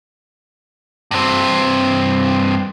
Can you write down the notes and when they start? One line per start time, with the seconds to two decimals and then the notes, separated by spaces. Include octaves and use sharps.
1.11 G2 C4